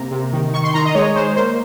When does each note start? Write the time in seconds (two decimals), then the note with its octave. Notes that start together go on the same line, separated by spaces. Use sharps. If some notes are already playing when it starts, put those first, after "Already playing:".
Already playing: C3 A#3 A#5
0.11 C3
0.33 D#3
0.53 D#3 C#6
0.64 C6
0.74 D#3 A#5
0.85 D#5
0.95 G#3 C#5
1.16 G#3 C5
1.36 A#3 C5